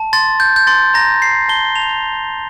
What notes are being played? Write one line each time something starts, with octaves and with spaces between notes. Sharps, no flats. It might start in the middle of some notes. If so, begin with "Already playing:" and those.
Already playing: A5
C6 A6
G6
G6
C6 A6
A#5 A#6
G6 C7
A5 G7
A5 F7